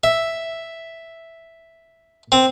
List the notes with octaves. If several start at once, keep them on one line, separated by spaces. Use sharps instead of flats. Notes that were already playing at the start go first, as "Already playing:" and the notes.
E5
C4